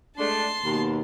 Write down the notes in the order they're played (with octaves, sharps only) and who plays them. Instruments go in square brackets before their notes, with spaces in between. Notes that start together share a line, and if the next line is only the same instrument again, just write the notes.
[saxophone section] G#3 A3 D4 [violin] A5 C6
[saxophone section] D#2 B2